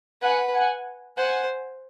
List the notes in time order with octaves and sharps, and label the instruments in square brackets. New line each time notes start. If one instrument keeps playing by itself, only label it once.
[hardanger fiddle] B4 [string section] F#5 G#5
[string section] F#5 G#5
[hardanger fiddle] C5 [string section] F#5 G#5